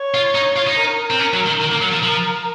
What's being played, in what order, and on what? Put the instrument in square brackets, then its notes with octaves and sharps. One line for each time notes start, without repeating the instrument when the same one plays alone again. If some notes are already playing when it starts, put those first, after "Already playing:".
Already playing: [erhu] C#5
[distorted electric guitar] F4
D#4
F4
D#4
[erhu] A#4
[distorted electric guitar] C4
C#4
F#3
D#3
D#3
A#3
F#3
F3
[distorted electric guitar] F3 [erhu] A#4